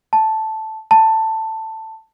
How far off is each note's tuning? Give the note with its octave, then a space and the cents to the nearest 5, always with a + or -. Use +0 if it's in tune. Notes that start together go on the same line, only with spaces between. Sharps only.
A5 -5
A5 +10